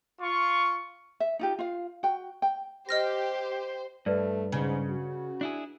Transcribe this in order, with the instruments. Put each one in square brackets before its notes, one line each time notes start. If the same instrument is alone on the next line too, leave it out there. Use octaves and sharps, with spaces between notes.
[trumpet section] F4 C#6
[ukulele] E5
D#4 F4 G4
F4 F5
F#4 G5
G5
[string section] G4 [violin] C5 [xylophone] D#5 F6 A#6
[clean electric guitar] G2 [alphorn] A3 [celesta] B4 D5
[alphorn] G#2 [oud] C#3
[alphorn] F#4
[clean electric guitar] D4 E4 G#4